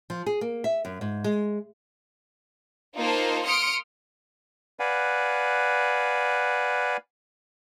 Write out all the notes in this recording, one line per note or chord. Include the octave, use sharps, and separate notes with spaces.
F3
G#4
A#3
E5
F#2
G#2
G#3
A#3 D#4 F4 A#4 C5 A5
C6 D#6 F6 C#7 D7
B4 D5 F5 F#5 G#5